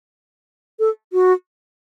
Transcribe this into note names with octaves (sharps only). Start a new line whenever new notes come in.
A4
F#4